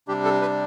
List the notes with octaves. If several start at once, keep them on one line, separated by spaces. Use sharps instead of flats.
C3 G3 D4 G4
A4
B4